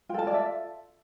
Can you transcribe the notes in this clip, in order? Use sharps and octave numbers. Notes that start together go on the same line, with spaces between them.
F4 A4 G5 A5
D5
E5